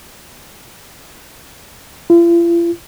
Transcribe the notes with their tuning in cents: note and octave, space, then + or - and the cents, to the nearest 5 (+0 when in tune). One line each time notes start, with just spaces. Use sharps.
F4 -45